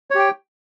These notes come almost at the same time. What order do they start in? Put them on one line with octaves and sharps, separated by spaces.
C#5 G4 G5